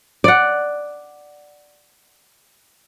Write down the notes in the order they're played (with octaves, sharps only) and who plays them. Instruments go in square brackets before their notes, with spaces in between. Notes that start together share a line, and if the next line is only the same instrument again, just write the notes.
[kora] D5 F#5